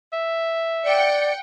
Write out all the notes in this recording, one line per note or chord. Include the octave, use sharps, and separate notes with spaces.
E5
D5 F#5 G5 C#7